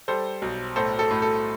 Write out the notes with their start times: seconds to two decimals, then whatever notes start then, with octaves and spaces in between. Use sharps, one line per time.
0.08 G3 A4 C5
0.42 B1
0.76 A2 A4 C5
0.99 A4
1.11 A2
1.22 A4